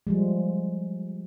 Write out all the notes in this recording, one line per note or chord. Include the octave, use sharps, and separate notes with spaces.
F3 G3 G#3